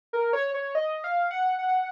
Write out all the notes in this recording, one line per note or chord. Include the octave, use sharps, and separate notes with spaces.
A#4
C#5
C#5
D#5
F5
F#5
F#5